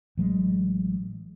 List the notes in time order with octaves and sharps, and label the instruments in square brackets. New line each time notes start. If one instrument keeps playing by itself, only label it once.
[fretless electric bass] A1 F#3 G#3